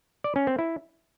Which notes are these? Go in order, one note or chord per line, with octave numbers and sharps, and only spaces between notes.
D5
C#4
C4
E4